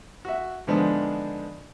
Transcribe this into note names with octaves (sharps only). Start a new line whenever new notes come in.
F#4 E5
G#2 D3 F3 G#3 B3 D4